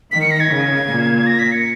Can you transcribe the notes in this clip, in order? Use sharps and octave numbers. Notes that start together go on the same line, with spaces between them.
D#3 B6
C#7
A#6
G#6
C#3
A#2
A#6
B6
C#7